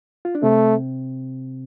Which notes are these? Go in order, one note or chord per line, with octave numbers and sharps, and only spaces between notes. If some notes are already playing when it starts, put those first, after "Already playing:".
F4
D4
C3 A3 C4